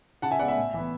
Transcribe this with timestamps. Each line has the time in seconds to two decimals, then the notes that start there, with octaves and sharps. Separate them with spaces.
0.22 C#3 F#5 A5
0.31 E5 G#5
0.39 G#3 B3 D5 F#5
0.48 E5
0.57 A2
0.74 E3 B3